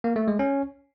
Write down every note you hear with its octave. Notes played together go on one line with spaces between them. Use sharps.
A#3
A3
G#3
C#4